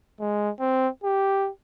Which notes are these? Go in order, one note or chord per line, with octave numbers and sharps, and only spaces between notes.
G#3
C4
G4